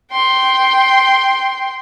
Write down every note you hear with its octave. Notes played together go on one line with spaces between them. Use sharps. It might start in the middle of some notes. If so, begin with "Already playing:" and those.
G5 C6